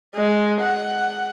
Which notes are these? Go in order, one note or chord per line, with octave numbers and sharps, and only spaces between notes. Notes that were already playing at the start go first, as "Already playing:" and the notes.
G#3
F#5